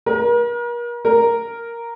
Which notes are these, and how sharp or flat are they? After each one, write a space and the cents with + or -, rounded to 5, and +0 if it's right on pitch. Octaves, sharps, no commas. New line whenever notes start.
A#4 +40
A#4 +0